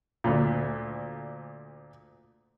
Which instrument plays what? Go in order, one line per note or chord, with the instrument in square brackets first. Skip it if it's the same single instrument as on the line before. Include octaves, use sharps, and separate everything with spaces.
[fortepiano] D2 A#2